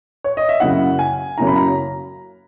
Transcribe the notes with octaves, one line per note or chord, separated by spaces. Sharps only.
C#5
D#5
E5
F#2 C#3 F#3 A#3 E4 F#5
G#5
F#2 C#3 F#3 A#3 E4 A#5
B5
A#5